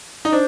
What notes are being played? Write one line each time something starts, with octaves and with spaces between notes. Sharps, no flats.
D#4
D4 C5